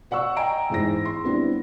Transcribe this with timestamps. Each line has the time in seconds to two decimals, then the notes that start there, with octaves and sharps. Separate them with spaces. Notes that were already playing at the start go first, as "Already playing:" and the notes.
0.11 D5 F#5 C#6 E6
0.37 D#5 G5 G#5 A#5 D7
0.70 E2 G#2 E4 C5 A#6
1.05 C6
1.24 G3 B3 C4 D4 E4